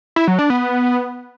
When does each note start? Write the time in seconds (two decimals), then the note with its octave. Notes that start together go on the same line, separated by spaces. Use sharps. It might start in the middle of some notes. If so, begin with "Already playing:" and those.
0.16 E4
0.27 F#3
0.39 D4
0.50 B3